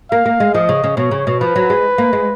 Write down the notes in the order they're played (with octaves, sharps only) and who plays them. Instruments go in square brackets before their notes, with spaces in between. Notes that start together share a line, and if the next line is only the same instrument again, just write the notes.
[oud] A#3 [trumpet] F5
[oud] A#3
G#3
[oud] F3 [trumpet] D#5
[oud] C#3
C#3
[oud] B2 [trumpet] C#5
[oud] C#3
B2
[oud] F3 [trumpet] B4
[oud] F#3
G#3
A#3
G#3